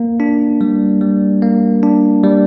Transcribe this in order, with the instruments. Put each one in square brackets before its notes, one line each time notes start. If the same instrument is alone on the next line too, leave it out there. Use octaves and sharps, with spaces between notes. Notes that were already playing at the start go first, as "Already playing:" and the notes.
Already playing: [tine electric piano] A#3
D4
G3
G3
A#3
D4
G3